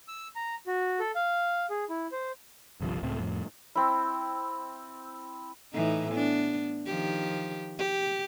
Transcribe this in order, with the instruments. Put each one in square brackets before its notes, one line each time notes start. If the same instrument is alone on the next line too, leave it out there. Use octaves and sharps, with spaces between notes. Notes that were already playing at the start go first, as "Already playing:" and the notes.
[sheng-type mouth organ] E6
A#5
F#4
A4
F5
G#4
E4
C5
[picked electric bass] G1 C2 G2 F3
C#2 A2 A3 C4
F2 A2
[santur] C4 E4
[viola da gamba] A2 E3 D#4
B3 D4
D#3 F3 G4
G4